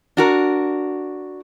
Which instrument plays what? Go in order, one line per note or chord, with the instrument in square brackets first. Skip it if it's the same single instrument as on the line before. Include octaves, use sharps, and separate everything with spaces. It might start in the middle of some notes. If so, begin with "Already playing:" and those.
[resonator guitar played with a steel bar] D4 F#4 A#4